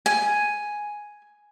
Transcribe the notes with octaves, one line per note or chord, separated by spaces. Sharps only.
G#5